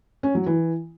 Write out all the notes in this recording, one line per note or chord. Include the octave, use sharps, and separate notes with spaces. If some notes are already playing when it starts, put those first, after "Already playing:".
C#4
F#3
E3